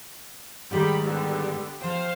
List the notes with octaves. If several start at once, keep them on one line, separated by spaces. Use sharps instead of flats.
G#2 D#3 G3 G#3 G4 B5
D3 G3 B3
F3 C5 F5 G5